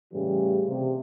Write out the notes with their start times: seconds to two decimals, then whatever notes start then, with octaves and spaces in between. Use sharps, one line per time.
0.13 A2 C#3 E3 G3
0.67 C3